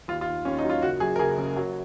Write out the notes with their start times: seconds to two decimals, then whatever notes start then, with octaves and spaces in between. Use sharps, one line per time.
0.08 D#2 F4
0.21 F4
0.27 D#3
0.45 D#2 C#4
0.58 D#4
0.64 F#3
0.70 F4
0.82 F#1 F#4
1.00 F#2 G#4
1.16 A#4
1.19 F#1 G#4
1.38 C#3
1.56 F#3